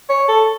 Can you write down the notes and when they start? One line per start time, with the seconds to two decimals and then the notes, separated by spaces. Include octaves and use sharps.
0.09 C#5
0.29 A4